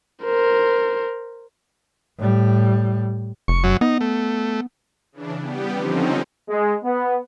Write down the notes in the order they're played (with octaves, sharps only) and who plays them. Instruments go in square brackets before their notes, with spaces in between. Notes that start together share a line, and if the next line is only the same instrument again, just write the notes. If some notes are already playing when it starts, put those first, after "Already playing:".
[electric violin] A#4 C5
[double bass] A2 G3
[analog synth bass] F1 [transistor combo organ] C#6
[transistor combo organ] F#2 F#3
[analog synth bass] B3 [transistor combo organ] D#4
[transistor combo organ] A3
[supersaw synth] C#3 E3 D4
G3 B3 G4
D3 F3 C4 C#4 D#4
[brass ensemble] G#3
B3